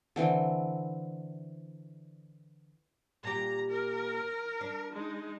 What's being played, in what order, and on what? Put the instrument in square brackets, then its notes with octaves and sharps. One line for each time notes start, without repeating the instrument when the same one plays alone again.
[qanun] D3 E3 C4
[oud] A#2 G4 [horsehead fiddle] A#5
[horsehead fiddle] A#4
[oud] D4
[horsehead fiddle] G#3 D#4